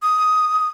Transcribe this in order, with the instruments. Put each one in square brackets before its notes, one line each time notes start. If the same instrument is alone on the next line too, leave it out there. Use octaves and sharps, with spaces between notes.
[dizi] D#6